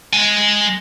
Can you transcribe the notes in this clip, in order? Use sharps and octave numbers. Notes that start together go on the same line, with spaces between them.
G#3 G#5